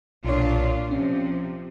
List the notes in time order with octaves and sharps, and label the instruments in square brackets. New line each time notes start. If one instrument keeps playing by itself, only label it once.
[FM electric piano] B1 C#5 [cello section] A#2 D4 F4
[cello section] C3 F3 [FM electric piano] C#4